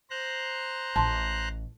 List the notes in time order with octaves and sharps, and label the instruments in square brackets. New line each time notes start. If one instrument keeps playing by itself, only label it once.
[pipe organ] C5 A#5 F#6
[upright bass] A1 [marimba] A5 C6